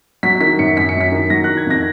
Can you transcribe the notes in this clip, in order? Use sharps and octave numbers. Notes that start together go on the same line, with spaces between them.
F#3 B6
D#3 B6
F#2 C#7
F#2 B6
C#7
F#3
B6
D#3
F#3 A#6
D#3 F#6
G#6
F2 A#6